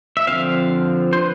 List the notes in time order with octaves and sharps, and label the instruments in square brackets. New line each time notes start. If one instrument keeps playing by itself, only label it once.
[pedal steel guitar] E5
D3 F3 C4 F5
C5
B4